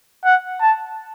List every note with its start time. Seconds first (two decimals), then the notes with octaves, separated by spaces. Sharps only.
0.25 F#5
0.61 A5